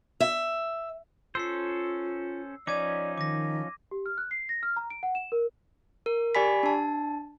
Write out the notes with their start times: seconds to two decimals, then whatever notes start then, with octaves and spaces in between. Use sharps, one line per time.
0.20 E5
1.35 C#4 F4 A4 C5 E6 C7
2.67 F3 C#4 D#4 D5 D6 G#6 D#7
3.18 D#3 D6 A#6
3.91 G4
4.06 F6
4.18 F#6
4.31 C7
4.49 A#6
4.63 F6
4.77 A#5
4.90 D7
5.03 F#5
5.15 E7
5.32 A#4
6.06 A#4
6.35 G4 D5 G#5 B5 B6
6.63 D4 A5